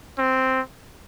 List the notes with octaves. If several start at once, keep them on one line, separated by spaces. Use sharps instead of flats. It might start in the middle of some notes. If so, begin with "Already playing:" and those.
C4